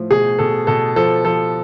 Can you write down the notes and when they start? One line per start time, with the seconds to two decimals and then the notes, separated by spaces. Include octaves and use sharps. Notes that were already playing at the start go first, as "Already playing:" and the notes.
Already playing: A2 F3
0.11 B2 G#4
0.39 B2 A4
0.67 B2 A4
0.96 F3 A4
1.25 F3 A4